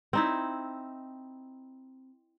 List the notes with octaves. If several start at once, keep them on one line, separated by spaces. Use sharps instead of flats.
C4 D#4 E4